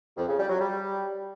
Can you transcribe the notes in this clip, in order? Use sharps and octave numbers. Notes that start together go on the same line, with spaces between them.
F2
C#3
G3
F#3
G3